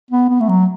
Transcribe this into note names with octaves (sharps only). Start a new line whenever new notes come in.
B3
B3
A3
F#3